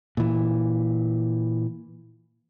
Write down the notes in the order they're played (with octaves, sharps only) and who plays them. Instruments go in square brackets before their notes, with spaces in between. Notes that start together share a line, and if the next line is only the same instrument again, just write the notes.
[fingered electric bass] A#2 E3